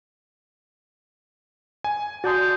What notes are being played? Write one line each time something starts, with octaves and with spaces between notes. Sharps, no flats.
G#5
F#4 D5 A5 C6 D#6 G6 A6